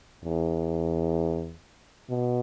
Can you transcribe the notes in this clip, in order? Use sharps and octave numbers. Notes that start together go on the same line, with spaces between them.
E2
B2